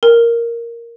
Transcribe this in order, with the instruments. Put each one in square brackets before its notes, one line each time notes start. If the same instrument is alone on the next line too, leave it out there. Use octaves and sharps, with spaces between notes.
[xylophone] A#4